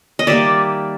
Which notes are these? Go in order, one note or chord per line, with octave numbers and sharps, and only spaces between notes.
D#5
D#3 G3 A#3 D5 E5